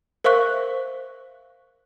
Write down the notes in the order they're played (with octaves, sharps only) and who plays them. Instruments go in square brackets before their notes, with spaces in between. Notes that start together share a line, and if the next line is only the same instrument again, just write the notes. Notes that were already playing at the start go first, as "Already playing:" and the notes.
[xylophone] A#4 C5 E5 F5 C#6 F#6